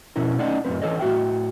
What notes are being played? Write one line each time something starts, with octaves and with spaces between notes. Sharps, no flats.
F2 B2 C#4 E4 A#4
A3 C#4 D#4 D5 D#5 F#5
F#2 A2 F3 C4 B4
E3 F3 A4 C#5 D#5
A2 F#4 E5 G5